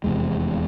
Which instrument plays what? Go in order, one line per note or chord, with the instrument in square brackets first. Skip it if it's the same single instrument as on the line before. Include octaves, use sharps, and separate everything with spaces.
[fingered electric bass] F1 E2 C3 G#3